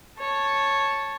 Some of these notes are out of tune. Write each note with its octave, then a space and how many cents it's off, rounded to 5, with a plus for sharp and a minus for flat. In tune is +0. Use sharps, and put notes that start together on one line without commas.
C#5 -5 A5 +0